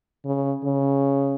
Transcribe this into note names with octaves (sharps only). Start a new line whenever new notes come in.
C#3
C#3